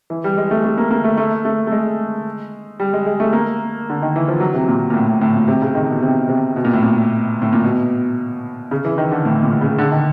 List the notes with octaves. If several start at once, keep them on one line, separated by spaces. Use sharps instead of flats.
E3
G3
G#3
A3
A3
A#3
A#3
A3
A3
A3
A3
G#3
G3
G#3
G#3
A3
A#3
D3
D#3
E3
F3
F#3
C3
A#2
A#2
A2
A2
A2
A#2
C3
C#3
D#3
B2
C3
C3
B2
A#2
A2
A#2
A2
A#2
B2
C#3
E3
D#3
D3
A2
A#2
C#3
D3
D#3